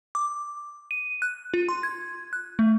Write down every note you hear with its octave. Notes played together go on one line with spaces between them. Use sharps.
D6
D#7
F#6
F4
C6
G#6
F#6
A3